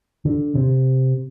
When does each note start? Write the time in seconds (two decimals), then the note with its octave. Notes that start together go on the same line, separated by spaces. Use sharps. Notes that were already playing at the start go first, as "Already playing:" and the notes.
0.25 D3
0.55 C3